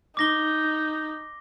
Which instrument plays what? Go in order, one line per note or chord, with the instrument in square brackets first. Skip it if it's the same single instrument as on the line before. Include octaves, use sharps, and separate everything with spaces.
[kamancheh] D#4 [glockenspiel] D6 A#6 G7